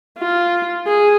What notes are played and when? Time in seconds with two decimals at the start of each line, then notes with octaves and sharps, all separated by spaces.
0.19 F4
0.86 G#4